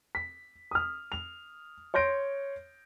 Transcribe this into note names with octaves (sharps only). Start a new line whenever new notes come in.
B6
D#6 F6
F7
C#5 C6 G6 A#6 D7